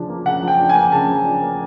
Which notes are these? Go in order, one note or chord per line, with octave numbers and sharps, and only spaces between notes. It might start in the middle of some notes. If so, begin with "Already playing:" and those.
Already playing: C#3 F3 D4
A#3
C#3 F#5
F3
G5
D4
G#5
A#3
C#3 A5
F3
D4
A#3